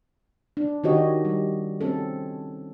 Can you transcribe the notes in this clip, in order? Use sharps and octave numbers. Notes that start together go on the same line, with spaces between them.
D4
D#3 D#4 F#4 G4 C#5 D#5
G3
C4 C#4 A4